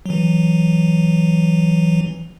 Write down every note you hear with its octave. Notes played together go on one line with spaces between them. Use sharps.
E3 F#3